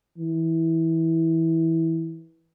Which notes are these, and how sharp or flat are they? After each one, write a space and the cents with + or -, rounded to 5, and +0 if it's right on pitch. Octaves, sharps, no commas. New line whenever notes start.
E3 -15